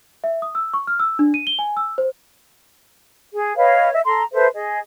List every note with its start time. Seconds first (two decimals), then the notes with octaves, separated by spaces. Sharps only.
0.24 E5
0.42 D#6
0.55 E6
0.74 C#6
0.87 F6
1.00 E6
1.19 D4
1.34 D#7
1.47 G7
1.59 G#5
1.77 E6
1.98 C5
3.33 G#4
3.57 B4 C#5 D#5 F5
3.93 D#5 E5
4.05 A4 A#5 C6
4.32 A4 B4 C5 E5
4.54 G#4 D#5